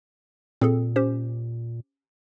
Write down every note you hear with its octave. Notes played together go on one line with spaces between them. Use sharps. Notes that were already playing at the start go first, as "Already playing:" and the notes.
A#2 C4 G#4 A4
C#4 G4 C5